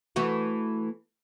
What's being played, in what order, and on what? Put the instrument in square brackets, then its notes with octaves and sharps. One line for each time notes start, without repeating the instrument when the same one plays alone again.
[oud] E3 A3 F#4